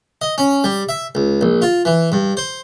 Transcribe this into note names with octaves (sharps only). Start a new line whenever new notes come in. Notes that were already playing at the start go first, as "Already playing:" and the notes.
D#5
C#4
G3
E5
C#2
A#1
F4
E3
G2
C5